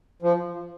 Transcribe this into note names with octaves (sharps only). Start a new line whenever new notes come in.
F3